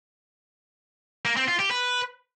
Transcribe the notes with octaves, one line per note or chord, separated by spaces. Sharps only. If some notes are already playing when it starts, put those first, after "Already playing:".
A#3
C4
F4
G4
B4